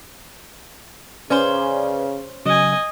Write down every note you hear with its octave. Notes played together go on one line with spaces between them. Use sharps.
C#3 C#4 B4 C5 D5 G#5
C#3 F#3 D#5 G#5